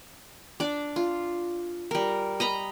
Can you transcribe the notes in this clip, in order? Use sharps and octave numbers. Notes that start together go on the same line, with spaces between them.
D4 D5
F4
G3 A#4
D#5 A#5 B5